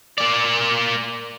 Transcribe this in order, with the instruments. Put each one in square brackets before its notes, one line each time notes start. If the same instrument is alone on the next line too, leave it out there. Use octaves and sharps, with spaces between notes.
[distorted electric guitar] A#3 D5